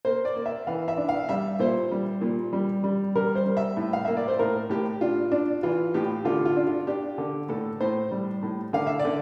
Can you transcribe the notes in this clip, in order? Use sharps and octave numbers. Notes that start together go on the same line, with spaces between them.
A#3 C5
D5
A#3
E5
E3 F5
E5
D4
F5
G3 E5
A#2 C5
G3
A#2
G3
G3
G3 A#4
C5
G3
E5
A2
F5
A#3 E5
D5
C5
A2 A#4
A2 G4
D4 F4
D4
E3 F4
A2 G4
D3 F4
F4
D4
F4
D4 G4
D3
A2 A4
A2 C5
G3
A2
D3 F5
E5
D5
D3